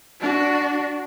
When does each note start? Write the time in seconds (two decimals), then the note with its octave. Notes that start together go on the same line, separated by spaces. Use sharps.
0.20 D4 F#4